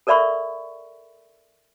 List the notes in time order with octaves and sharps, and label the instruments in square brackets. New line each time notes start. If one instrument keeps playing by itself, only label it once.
[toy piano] A4 A#4 D5 E5 B5 C#6